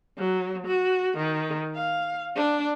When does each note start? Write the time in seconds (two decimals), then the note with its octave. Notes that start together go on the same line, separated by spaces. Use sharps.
0.18 F#3
0.67 F#4
1.18 D#3
1.75 F5
2.36 D4